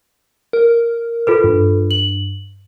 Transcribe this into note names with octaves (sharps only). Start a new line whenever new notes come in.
A#4
F4 A4 B4
G2
F#7